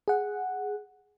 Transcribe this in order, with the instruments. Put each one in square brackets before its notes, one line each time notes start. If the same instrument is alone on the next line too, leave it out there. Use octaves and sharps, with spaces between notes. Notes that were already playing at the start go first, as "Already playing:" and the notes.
[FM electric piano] G#4 F#5